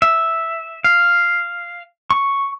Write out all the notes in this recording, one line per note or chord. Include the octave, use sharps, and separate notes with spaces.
E5
F5
C#6